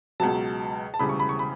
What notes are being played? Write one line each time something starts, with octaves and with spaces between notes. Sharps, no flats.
C#2 B2 F#3 A5
A5
E1 D2 C#3 E3 G3 B5
C#6
B5
C#6
B5